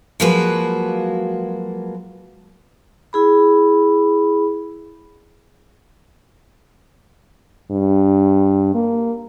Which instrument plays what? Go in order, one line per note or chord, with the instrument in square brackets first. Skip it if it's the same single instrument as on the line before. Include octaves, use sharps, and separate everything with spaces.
[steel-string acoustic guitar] F3 F#3 G#3 A#3 F#4 B4
[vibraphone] E4 G#4 B5
[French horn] G2
A#3